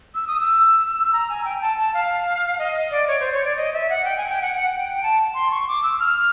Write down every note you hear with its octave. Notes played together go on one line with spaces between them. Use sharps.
E6
D#6
E6
A#5
G#5
G5
A5
A5
F5
D#5
D5
C#5
C5
C#5
D5
D#5
E5
F#5
G5
G#5
G5
F#5
F#5
G5
A5
C6
C#6
D6
E6
F6